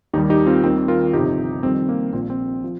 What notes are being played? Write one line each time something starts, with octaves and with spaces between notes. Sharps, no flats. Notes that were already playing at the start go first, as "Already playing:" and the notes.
D#2 D#3 G3 D#4 G4
D#4 G4
C4 F4
D#2 D#3 G3 C4
F4 A#4
G1 F2 C3 D#4 G4
F2 D#3 G3 C4
A#3
A#1 A#2 F3 C4
C4
F3